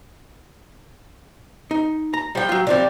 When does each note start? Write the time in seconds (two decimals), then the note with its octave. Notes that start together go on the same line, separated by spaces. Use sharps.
1.71 D#4
2.14 A#5
2.35 F3 G3 G5
2.49 F#3 F4
2.67 C3 F3 G3 C4 D5